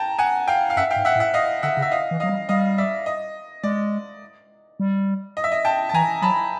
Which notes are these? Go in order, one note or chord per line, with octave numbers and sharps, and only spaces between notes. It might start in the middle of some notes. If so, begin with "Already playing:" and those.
Already playing: G5 A5 A#5
F#5 G#5
F5 G5
F5
F#2 E5 F#5
F5 G5
G#2
E5 F#5
A2
E5 F#5
D#5 F5
D3 E5 F#5
C#3
E5
D#5 F5
E3
F#3 D#5 F5
G3
G3 D#5 F5
D5 E5
D#5
G#3 D5
G3
D#5
E5
D#5
G5 A5
A5
E3 G#5 A#5
F#3 A5 B5